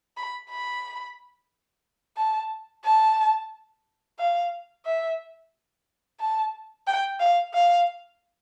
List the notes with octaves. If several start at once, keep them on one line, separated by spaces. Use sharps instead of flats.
B5
B5
A5
A5
F5
E5
A5
G5
F5
F5